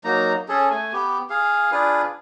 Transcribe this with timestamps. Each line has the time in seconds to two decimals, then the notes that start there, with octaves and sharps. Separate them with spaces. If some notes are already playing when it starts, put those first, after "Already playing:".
0.04 F#3 A#3 D#4 A#5
0.49 C#4 G#4 A4
0.71 A3 G#5
0.93 B3 G4
1.30 G#4 F5
1.72 D4 F4 G#4 B4